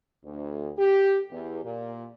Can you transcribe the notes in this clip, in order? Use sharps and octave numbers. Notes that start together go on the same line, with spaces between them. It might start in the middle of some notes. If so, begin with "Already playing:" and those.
D2
G4
E2
A#2